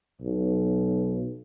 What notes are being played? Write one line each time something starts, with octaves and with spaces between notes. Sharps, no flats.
B1